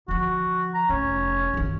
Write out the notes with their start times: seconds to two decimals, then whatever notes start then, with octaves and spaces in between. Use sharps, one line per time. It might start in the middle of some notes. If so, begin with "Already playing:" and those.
0.08 D3 F3 F#4
0.74 A#5
0.89 F1 C#4
1.54 F#1 D#3